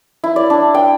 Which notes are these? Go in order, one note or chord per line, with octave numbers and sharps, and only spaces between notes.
E4
D5
D4
G5